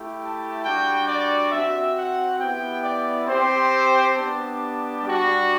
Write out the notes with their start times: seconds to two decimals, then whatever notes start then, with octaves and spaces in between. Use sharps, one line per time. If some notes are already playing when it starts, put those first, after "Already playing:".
Already playing: A3 E4 G4
0.21 A5
0.65 G3 D4 F#4 G5
1.08 D5
1.52 C4 F#4 E5
1.96 F#5
2.40 B3 E4 G4 G5
2.84 D5
3.28 C4 G4 C5
4.15 B3 D4 G4 A5
5.03 G3 D4 F#4